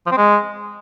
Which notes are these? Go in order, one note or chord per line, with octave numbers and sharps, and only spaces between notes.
F3
C4
G#3